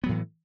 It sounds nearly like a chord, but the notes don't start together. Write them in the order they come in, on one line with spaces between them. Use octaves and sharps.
B3 F#3 A2 E3